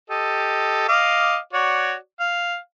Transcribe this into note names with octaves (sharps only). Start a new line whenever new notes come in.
G4 A4 D#5
D#5 F5 D6
F#4 C#5 D5
F5